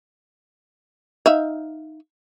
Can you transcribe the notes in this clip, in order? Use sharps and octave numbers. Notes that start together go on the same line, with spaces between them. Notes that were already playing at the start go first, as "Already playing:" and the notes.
D#4 E5 F5